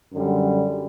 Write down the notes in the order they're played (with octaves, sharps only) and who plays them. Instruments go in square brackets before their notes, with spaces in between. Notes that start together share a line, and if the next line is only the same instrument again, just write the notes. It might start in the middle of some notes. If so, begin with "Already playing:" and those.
[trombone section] F#2 D3 G3